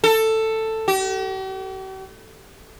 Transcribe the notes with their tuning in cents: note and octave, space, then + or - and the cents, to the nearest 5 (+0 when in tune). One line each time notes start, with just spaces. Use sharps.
A4 +10
G4 -45